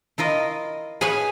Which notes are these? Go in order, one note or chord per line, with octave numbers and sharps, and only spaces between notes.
E4 F4 A#4 D#5
G#4 B4 C#5 F5 G#5